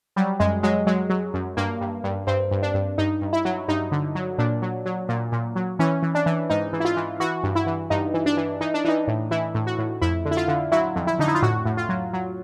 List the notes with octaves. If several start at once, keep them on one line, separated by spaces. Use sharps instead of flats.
F#3 G3
F#2 G#3
F#3 G#3
F#3 G#3
F#3
F#2
G2 A#3
G2
G2
G2 C4
G2
D4
G2
G2 D#4
G2
E4
F#3
G2 D#4
D3
F#3
A#2 D4
F#3
F#3
A#2
A#2
F#3
E3 C#4
E3
D4
E3
G#2 D#4
E3
E4
F4
E3
E3 F#4
G2
E4
E3
G2 D#4
E3
D4
E3
E3 D#4
D4
E3 D#4
A2
E3 E4
A2
F#4
A2
F2 E4
D3
E4
F4
D3
F#3 E4
F2
E4
D3 D#4
E4
F4
A2 F#4
A2
F4
F#3
F#3